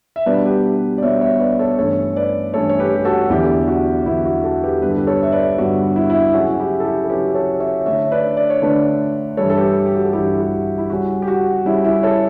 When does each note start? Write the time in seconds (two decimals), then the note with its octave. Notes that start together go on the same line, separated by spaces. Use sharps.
0.16 E5
0.26 B2 G3 B3 D4 B4 D5
0.46 G4 B4
0.98 D5
1.03 B2 G3 B3 D4 C#5 E5
1.21 C#5 E5
1.40 B4 D5
1.59 A4 C#5
1.78 G2 E3 A3 C#4 A4 C#5
2.16 B4 D5
2.54 G2 E3 A3 C#4 A4 C#5
2.69 C#5
2.80 G4 B4
2.94 G4
3.05 F#4 A4
3.30 E2 D3 F#3 B3 E4 G4
3.68 F#4
4.06 E2 D3 F#3 B3 E4
4.25 F#4
4.44 F#4 A4
4.63 G4 B4
4.82 G2 D3 G3 B3 B4
4.91 A4
4.98 G4 B4
5.07 A4 C#5
5.22 E5
5.32 B4 D5
5.58 G2 D3 G3 B3 F#4
5.96 E4
6.10 E4
6.34 C#3 F#3 C#4 F#4
6.59 E4 G4
6.80 A4
6.85 E4 G4
7.04 A4
7.10 C#3 F#3 C#4 G4 B4
7.35 A4 C#5
7.60 C#5 E5
7.85 D3 A3 D4 C#5 E5
8.12 B4 D5
8.37 D5
8.50 C#5
8.62 D3 A3 D4 B4 D5
9.37 G2 E3 G3 A4 C#5
9.49 A4
9.57 G4 B4
9.86 G4
9.95 F#4
10.05 A4
10.13 G2 E3 G3 E4 G4
10.39 F#4
10.78 E4
10.90 C#3 G3 C#4 F#4
11.22 G4
11.28 F#4
11.65 C#3 G3 C#4 E4
11.84 E4
12.03 A4 C#5